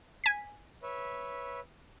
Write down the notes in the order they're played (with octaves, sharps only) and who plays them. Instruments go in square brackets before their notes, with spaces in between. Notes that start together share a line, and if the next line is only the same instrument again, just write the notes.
[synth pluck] G#5 B6
[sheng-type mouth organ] B4 C#5 E5